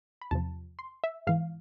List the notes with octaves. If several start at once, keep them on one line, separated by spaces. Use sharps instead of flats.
B5
E2 C3 F3 A5
C6
E5
G#2 E3 F5